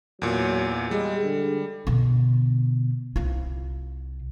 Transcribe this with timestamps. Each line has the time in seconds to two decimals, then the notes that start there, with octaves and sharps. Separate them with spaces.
0.22 E2 A#2 F#3
0.91 G3 G#3
1.24 D3
1.87 B2 D3
3.16 C2 F4